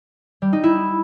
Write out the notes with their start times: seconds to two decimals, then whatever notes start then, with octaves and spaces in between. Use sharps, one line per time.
0.42 G3
0.53 D#4
0.63 E4